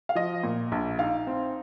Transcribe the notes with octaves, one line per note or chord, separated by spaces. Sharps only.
F5
F3 D#5
A#2
A#1
D#4 F5
C4